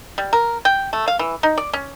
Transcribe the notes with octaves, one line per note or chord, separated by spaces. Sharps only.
G3
A#4
G5
A3
F5
E3
D#4
D5
C#4